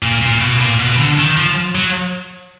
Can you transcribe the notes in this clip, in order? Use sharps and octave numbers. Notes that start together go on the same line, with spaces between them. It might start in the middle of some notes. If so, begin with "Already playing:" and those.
A#2
A#2
B2
A#2
B2
D3
D#3
F3
F#3